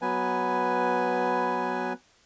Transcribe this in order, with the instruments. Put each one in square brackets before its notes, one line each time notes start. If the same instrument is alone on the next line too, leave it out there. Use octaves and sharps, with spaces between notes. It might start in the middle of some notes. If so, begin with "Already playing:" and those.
[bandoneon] F#3 B3 B4 G#5